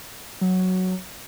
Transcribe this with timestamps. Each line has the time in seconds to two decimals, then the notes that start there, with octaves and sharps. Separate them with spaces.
0.41 F#3